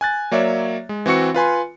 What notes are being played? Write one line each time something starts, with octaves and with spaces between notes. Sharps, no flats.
G#5 F#6 A6
F#3 A#3 C#5 D5 E5
G#3
E3 C4 F#4 C#6 C#7
F4 B4 G#5 C6